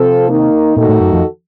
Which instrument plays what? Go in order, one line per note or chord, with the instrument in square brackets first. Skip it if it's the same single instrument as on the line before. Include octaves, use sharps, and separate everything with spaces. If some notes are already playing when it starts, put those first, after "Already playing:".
Already playing: [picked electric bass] C3 [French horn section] F3 C4 F4 A4
[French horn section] D#3 A#3 D#4
[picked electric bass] A#2 [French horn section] D#3 A3 D#4 F#4 A4
[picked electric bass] A2
F#2
F2